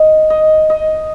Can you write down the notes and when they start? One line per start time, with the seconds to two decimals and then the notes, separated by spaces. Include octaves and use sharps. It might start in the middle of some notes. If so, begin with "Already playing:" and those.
Already playing: D#5
0.30 D#5
0.70 D#5